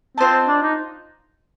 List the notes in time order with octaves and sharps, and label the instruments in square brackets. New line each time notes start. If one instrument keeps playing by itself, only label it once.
[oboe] C4 [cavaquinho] F4 C5 D#5 A5
[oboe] D4
D#4